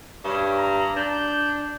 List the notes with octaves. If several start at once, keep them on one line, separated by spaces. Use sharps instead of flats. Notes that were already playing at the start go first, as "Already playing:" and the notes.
G2 C#5
A#5
D4 G6